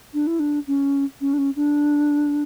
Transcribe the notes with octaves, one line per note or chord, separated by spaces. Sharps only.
D4
E4
D4
C#4
C#4
D4
C#4
D4